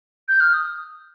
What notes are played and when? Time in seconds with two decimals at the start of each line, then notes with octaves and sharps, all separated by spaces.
0.28 G6
0.40 F6
0.54 D#6